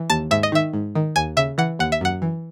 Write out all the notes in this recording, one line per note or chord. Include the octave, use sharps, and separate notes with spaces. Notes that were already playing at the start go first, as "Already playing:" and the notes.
Already playing: E3
D#2 A5
G#2 E5
D#5
D#3 E5
G#2
D#3
D#2 G#5
C#3 E5
E3 F#5
D#2 F#5
E5
F#2 F#5
E3